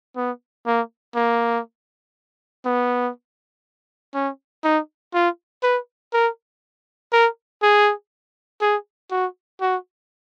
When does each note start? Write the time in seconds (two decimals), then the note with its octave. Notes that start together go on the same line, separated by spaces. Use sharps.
0.16 B3
0.66 A#3
1.15 A#3
2.65 B3
4.14 C#4
4.64 D#4
5.14 F4
5.63 B4
6.13 A#4
7.12 A#4
7.62 G#4
8.61 G#4
9.11 F#4
9.61 F#4